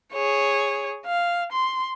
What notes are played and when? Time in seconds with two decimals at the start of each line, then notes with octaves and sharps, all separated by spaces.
0.13 G#4 C#5
1.06 F5
1.52 C6